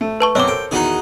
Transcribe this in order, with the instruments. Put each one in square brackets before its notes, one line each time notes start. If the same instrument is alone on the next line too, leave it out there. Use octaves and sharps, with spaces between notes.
[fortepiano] A3
[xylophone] B4 A5 C#6
[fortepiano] B1 F#2 [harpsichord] C4 [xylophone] C#5 D6
[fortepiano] A4 A#4 C5 [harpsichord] G5
[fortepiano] E2 D#3 [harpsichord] D#4 F#4 G#4